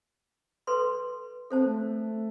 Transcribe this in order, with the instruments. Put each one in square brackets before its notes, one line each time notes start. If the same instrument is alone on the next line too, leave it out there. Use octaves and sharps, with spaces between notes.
[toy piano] A4 B4 C6
[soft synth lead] C4 [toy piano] A4 C5 A5
[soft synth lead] A3